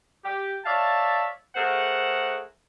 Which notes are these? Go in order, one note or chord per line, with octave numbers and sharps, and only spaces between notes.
G4
C#5 D5 E5 F5 A5
A3 G#4 A#4 C5 F#5